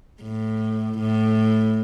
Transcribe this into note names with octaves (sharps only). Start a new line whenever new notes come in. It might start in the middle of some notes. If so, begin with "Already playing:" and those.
A2
A2